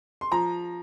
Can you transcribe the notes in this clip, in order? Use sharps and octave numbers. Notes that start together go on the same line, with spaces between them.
C6
F3 A#5